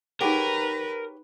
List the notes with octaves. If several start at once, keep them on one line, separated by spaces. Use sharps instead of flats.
D#4 G4 G#4 A#4 B4 C#5 F#5